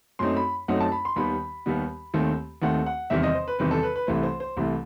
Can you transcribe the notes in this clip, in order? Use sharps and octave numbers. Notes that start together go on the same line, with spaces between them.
F#2 F#3 A3 C4 D#4 C6
B5
F#2 F#3 A3 C4 D#4 F#5
A5
B5
C6
D#2 D#3 G3 B3 B5
D#2 D#3 G3 B3
D#2 D#3 A3 C4
D#2 D#3 A3 C4 F#5
F#5
E2 C3 D#3 G3 C4 E5
D#5
C5
B4
E2 C3 D#3 G3 C4 B4
A4
B4
B4
C2 C3 E3 A3 C5
C5
C5
C2 C3 E3 A3